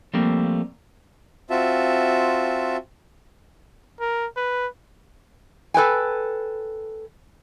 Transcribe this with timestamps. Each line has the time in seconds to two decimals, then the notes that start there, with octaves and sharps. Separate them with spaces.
0.14 F3 G3 A3 A#3 C4
1.50 C4 F4 F#4 E5 A5
4.00 A#4
4.36 B4
5.74 A4 B4 G5 G#5